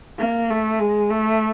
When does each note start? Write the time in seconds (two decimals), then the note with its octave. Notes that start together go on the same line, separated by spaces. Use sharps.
0.19 A#3
0.50 A3
0.80 G#3
1.10 A3